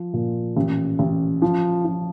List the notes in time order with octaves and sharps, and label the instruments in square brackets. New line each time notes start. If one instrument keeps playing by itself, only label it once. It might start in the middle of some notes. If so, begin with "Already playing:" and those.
Already playing: [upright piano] F3
A#2
A1
A1
F3
F3